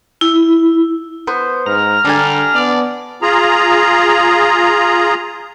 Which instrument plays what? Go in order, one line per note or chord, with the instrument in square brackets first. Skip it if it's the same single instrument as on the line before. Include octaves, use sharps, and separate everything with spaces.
[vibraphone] E4
[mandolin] B3 C5
[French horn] G#2 [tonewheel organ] A#5 F6
[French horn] D3 [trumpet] G3 [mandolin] D4 G#5
[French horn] B3 [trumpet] D5
[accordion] F4 G#4 A#5